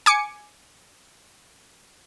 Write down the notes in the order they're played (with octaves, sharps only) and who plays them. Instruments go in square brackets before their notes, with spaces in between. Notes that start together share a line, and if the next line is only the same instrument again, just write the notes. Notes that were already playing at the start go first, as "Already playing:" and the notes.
[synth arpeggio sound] G#5 D6 C#7